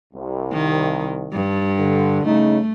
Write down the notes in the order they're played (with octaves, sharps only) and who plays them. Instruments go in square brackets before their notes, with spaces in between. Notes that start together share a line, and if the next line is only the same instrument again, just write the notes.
[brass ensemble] C2
[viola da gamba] D#3
G2
[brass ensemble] D3
[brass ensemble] C#3 D#4 [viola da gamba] A3